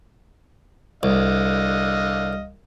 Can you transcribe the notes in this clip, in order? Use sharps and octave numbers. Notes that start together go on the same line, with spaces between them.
C2 D3 D#5 F5